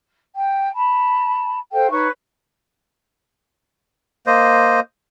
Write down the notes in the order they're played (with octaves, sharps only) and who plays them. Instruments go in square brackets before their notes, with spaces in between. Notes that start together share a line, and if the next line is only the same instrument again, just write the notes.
[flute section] G5
A5 B5
A4 C5 F5 G5
D#4 B4 C#5 C#6
[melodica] A#3 C5 D#5